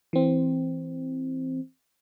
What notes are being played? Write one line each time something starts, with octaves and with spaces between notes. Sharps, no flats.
E3 C4